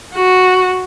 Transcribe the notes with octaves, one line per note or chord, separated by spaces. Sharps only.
F#4